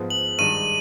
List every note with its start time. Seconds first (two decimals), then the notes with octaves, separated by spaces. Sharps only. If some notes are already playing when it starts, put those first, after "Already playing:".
Already playing: G#2 F3 G#3 B3
0.10 F#7
0.38 G2 D#3 G#3 D#7